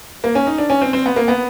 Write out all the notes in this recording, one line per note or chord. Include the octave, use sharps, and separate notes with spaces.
A#3
C#4
D#4
D4
C#4
C4
C4
B3
A#3
B3